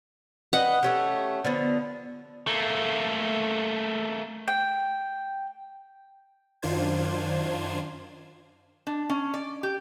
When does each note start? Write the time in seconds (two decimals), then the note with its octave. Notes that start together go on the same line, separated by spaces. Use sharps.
0.53 B4 D#5 F#5 G5
0.83 A3 C#4 G4
1.45 D3 F3 B3
2.48 A3 A#3
4.48 G5
6.62 F#2 D#3 D4 F4 C5 G#6
8.87 D4
9.10 C#4
9.34 D5
9.63 G4